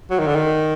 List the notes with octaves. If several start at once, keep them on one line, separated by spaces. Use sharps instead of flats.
F#3
D#3
D3
D#3